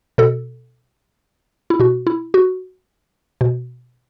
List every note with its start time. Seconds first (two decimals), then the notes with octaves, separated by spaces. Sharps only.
0.18 B2 A4
1.70 E4
1.80 B2 F#4
2.07 E4
2.34 F#4
3.41 B2